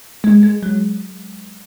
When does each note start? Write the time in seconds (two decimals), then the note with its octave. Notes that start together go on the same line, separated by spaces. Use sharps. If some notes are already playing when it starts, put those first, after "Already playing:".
0.24 G#3
0.43 G#3
0.63 F#3